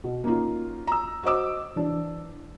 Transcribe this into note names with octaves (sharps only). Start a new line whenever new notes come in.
B2
A#3 C#4 D#4 F4
A#5 E6
F#4 C5 D#5 D6 E6
E3 D4